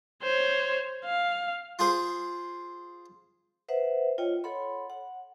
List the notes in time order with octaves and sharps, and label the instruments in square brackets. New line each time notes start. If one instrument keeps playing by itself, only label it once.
[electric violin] C5 C#5
F5
[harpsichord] F4 G#4 C5
[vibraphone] B4 C5 E5 F#5
F4 C#5 D#5 G5
A4 C#5 F#5 B5 C6
F#5